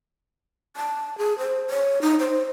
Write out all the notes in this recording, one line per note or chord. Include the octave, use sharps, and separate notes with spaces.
A5
G#4
C5
C#5
D#4
C5